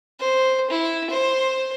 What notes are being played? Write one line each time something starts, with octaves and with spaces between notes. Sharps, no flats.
C5
E4
C5